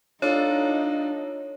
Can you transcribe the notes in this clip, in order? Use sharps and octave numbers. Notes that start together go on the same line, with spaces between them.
D4 D#4 F4 A4 C#5